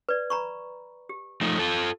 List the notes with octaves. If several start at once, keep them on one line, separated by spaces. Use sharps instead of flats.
B4 D5
A#5 B5 C#6
G4
F3 A3 D#4
F4 A4